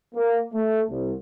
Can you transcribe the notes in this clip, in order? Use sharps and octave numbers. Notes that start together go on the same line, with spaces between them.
A#3
A3
C2